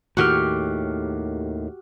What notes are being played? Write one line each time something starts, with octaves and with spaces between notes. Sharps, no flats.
D#2 A2 D#3 F#4 G4 F6